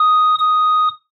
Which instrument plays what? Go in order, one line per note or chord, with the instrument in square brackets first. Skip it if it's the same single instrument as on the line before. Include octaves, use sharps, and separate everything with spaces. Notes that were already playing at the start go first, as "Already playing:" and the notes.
Already playing: [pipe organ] D#6
D#6